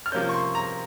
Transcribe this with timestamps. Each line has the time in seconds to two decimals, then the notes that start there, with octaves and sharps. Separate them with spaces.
0.06 F6
0.12 C3 F3 A#3 C#4 G6
0.29 C#6
0.34 C6
0.55 A#5